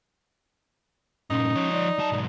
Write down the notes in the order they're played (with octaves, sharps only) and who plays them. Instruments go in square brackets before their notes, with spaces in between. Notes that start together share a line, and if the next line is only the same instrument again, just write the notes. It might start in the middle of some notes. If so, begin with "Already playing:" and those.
[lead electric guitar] G2 A#2 [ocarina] C#4 [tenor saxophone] D#4
[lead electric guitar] F3 C#5
[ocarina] D5
[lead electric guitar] F#3 A5
B1 G#2